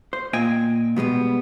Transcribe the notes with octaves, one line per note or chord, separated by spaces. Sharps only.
C5
A#2 D#5 G5 G#5
B2 G3 G#3 B3